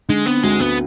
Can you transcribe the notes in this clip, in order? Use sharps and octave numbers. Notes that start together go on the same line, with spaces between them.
D3 G#3
B3 C4
D2 G#3
D2 B3